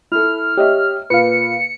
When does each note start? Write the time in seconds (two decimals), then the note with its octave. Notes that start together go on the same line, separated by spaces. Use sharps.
0.12 E4 A4 F6
0.57 G4 C#5 D#5 E5
1.10 A#2 B4 F5 C#7